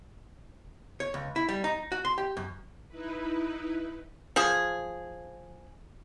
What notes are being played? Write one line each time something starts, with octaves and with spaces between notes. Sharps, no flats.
C#5
C#2
E4
G3
D#4
F#4
C6
G4
F#2
D#4 E4 B4
F3 G#4